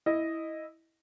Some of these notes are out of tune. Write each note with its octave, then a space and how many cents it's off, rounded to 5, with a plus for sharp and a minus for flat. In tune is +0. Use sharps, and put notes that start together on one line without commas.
E4 -10 D#5 +0